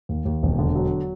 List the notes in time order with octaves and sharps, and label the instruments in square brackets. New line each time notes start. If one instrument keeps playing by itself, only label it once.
[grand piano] D#2
D#2
E1
D3
F#3